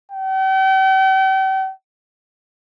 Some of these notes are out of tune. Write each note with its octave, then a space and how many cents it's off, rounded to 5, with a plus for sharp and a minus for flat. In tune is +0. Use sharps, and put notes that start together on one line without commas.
G5 -40